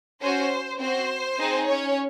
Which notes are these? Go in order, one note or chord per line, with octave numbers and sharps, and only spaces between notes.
C#4 F#4 C5
C4 F#4 C5
C4 D#4 G#4
C#4 C#5